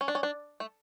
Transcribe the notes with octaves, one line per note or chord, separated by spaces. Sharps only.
C#4
D4
C#4
D4
A3